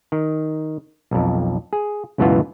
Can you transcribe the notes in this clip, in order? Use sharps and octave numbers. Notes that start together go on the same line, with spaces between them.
D#3
B1 F2
G#4
C#2 F#2 B2 E3 B3 F4